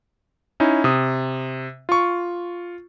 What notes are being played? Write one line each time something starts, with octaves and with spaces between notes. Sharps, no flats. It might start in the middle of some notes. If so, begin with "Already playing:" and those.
C#4 D#4 E4
C3 D#6
F4 C#6